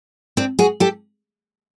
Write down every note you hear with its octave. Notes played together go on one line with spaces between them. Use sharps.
C4 D4
F#4 G#4
G4 A4